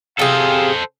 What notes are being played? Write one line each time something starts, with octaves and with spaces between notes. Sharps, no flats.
C3 G#4 A4 C5 F5